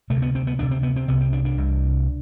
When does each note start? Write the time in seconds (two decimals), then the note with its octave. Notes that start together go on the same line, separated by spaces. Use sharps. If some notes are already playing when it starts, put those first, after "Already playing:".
0.10 D2 C3 A3
0.22 B3
0.35 C4
0.47 B3
0.59 D2 C3 D4
0.71 C4
0.83 B3
0.96 C4
1.08 C2 C3 B3
1.21 C4
1.33 D4
1.45 D4
1.57 C2 C3